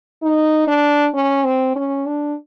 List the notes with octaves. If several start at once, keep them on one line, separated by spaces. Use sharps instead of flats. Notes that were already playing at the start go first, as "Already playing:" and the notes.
D#4
D4
C#4
C4
C#4
D4